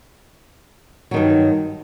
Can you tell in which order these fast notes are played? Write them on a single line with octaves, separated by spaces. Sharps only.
F#3 D#3 G2